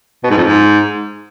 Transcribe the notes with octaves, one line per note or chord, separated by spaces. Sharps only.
B2
G#2
F2
G#2